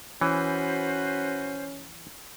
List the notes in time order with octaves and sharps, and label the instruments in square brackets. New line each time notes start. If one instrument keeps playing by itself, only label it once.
[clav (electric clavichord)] E3 [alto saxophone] C#4 [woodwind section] F#4 B4 C5